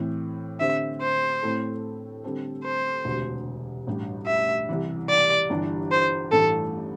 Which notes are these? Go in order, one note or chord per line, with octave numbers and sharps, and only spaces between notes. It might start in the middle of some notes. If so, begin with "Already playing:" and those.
Already playing: A2 E3 C4
D3 C4 G4 C5 E5
C5
A2 A3 C4 E4 A4
D3 G3 C4 A4 C5
C5
E1 D2 C3
A1 G2 G3
E5
C2 C3 E3
D5
G1 G2 E3 G3 D4
C5
A1 G2 E3 A3 A4